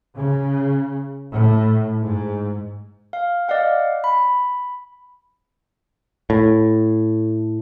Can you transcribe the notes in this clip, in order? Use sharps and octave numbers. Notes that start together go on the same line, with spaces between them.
C#3
A2
G#2
F5
D5 D#5 F5 F#5
B5
A2